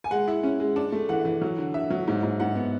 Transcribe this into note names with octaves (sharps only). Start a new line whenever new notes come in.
G#5
G#3 F#5
E4
C#4
G#3
D4
A3
E3 F#5
E3
F#3
D3
D3 E5
F#3
G#2
G#2
G#2 F#5
B3